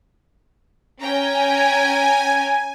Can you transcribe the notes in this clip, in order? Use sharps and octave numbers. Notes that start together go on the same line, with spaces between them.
C#4 G5 G#5 A#5